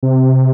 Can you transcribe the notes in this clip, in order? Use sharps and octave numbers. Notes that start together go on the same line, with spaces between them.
C3